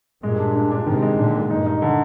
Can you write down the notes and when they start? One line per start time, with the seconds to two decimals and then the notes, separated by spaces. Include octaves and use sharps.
0.23 G2 A#2 G#3
0.39 D4
0.55 D4
0.71 D4
0.87 G#2 C3 D#3
1.02 G#3
1.18 A#2 D3 D4
1.34 G#3
1.50 G2 A#2 D#4
1.66 D#4
1.82 D3